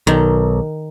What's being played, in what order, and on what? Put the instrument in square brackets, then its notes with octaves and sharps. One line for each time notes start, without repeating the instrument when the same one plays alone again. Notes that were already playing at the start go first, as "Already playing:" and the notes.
[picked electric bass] B1 [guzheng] D#3